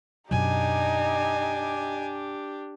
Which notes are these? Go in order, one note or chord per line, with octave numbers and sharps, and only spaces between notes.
F#2 B2 F#3 D4 D#4 G4 G#5